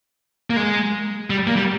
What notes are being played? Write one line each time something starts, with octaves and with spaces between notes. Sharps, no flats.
A#3
G#3
G3
A#3
G3